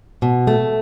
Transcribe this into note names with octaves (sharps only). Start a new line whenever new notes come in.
B2
A3